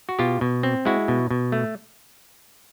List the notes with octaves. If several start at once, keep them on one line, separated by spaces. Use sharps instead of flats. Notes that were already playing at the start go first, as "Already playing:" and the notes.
F#4
B2 F4 G4
B2
C4
G#3 E4 F#4
B2
B2
A3